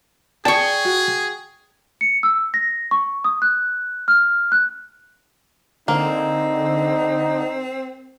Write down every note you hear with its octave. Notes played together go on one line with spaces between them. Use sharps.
G#4 D5 G5 A5 C#6
F#4
C#7
E6
A#6
C#6
D#6
F#6
F6
F#6
D3 A#3 C4 D#4